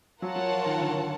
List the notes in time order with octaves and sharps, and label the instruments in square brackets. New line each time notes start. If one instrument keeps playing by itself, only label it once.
[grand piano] F#3 [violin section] F4 A#4 C#5 F#5 A5
[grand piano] F#3
F3
D#3
D3
D#3